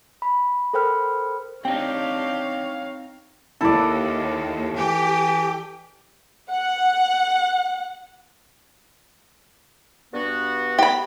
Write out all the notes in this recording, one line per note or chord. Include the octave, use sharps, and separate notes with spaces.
B5
A4 A#4 C5 G5 B5 F6
C4 D4 D#4 G4 C#5 F5 G5
D#2 E4 A4 D5
E3 G4
F#5
G2 B3 F#4
G4 B5